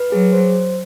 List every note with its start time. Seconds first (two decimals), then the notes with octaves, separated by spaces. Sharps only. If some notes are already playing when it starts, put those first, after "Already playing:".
Already playing: B4
0.11 F#3 G#4
0.33 C5